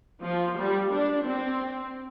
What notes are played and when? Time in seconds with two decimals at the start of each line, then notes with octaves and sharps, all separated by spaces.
0.23 F3
0.57 G3
0.91 D4
1.24 C4